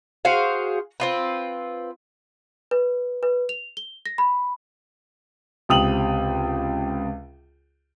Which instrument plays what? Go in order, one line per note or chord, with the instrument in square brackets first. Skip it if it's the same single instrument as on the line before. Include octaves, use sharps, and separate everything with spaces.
[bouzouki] F#4 G#4 C5 F5
C4 F4 B4
[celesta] B4
B4
F7
G7
A#6
B5
[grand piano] C#2 C3 G5 D#6 F7 F#7